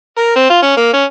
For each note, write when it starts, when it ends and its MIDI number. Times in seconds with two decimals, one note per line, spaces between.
0.17 0.32 70
0.36 0.49 60
0.50 0.58 65
0.62 0.75 61
0.77 0.91 58
0.93 1.04 61